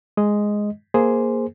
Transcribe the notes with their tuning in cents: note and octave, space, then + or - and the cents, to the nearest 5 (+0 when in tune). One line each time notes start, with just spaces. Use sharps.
G#3 +0 D#5 +0
A#3 +5 G#4 +0 C5 -5